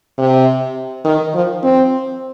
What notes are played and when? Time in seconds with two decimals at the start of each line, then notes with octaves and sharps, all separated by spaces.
0.18 C3
1.05 D#3
1.35 F3
1.63 C4